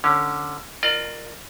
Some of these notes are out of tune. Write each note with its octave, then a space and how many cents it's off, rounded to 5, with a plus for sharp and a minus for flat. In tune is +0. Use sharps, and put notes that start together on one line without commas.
D3 +0 C#4 +0 F5 -25
F4 +0 A#4 +0 D5 +45